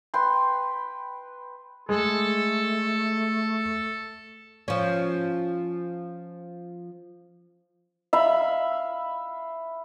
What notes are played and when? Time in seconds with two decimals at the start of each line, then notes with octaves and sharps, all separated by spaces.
0.14 B4 G5 C6
1.89 G#3 A3 A4
4.68 F3 C#4
8.13 E5 F5 B5